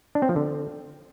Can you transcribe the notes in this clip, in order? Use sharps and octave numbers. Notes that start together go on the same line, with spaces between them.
D4
C4
F3
D3